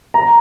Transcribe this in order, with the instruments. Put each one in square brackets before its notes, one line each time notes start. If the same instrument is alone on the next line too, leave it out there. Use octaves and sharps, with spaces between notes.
[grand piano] A#5